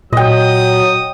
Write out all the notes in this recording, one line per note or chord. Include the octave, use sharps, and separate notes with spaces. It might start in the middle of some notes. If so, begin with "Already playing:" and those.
A#2 F#3 D#5 G5 D#6